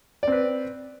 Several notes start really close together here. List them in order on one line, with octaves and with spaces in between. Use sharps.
D5 C4 B4